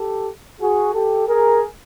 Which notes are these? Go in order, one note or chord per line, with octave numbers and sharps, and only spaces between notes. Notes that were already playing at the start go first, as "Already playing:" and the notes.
Already playing: G4 A4
F#4 G#4
G4 A4
G#4 A#4